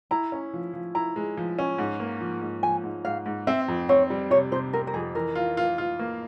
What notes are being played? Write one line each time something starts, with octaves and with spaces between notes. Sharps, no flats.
E4 A#5
C#4
F3
F3
E4 A#5
G#3
F3
C#4
G#2
A#3
F3
G#2
F3 G#5
G#2
G#2 F5
G#2
C4 E5
F2
C4 C#5
G3
C3 C#5
C3 C5
C4 A#4
A#4
F2 G#4
E3 A#4
F4
F4
F4
A#3